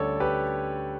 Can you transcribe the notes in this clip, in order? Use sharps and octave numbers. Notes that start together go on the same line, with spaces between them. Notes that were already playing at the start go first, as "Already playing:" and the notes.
Already playing: D2 D3 G3 C#4 A4 C#5 D5
G4 B4